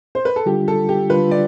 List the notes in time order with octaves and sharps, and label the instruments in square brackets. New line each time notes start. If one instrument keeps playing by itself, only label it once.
[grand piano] C5
B4
A4
[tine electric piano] D3 G3 D4 F4 [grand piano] G4
[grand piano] A4
G4
[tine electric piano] D3 G3 D4 F4 [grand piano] B4
[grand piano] D5